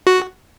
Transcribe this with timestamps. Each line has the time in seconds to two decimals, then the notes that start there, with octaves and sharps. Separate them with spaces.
0.07 F#4